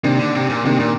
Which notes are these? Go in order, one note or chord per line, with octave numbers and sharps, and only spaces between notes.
C3 D#3 A#3 D4
D3
C3
A#2
C3 D#3 A#3 D4
A#2